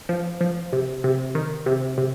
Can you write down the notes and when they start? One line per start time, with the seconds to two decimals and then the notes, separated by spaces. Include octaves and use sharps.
0.09 F3
0.41 F3
0.73 C3
1.04 C3
1.35 D#3
1.66 C3
1.98 C3